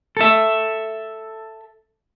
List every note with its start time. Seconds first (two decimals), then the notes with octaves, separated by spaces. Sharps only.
0.17 A4 E5